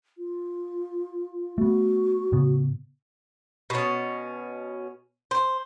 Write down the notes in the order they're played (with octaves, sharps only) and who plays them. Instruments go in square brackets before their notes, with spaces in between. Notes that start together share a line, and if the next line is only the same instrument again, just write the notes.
[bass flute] F4
[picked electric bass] A3 B3 [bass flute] F#4
[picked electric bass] A2 C#3 B3
[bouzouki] B2 C#4
C5